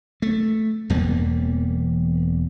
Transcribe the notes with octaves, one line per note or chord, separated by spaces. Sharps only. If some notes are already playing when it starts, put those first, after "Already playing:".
A3
E1 E2 G3 A#3